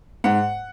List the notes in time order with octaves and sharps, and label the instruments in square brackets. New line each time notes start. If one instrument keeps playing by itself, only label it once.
[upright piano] G#2 F#5